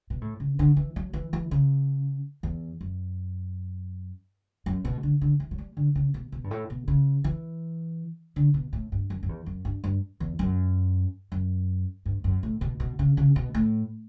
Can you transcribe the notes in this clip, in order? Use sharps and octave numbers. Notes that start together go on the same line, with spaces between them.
B2
A2
C#3
D3
E3
F#3
E3
E3
C#3
E2
F#2
F#2
B2
D3
D3
E3
F#3
G3
D3
C#3
B2
B2
G2
A2
B2
C#3
E3
D3
B2
A2
G2
F#2
F#2
E2
F#2
G2
G2
E2
F#2
F#2
G2
F#2
A2
B2
B2
C#3
C#3
B2
A2